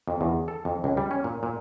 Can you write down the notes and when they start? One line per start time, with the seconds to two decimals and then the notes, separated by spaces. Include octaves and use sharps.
0.08 F2
0.21 E2
0.48 A4
0.65 F2
0.84 C#2
0.97 G3
1.11 C#4
1.24 A#2
1.43 A#2